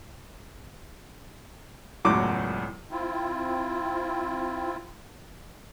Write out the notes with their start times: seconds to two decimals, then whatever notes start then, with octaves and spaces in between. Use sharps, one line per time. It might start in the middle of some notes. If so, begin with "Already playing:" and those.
2.05 E1 C#2 F#2 A2 F#4 D6
2.91 C4 E4 F4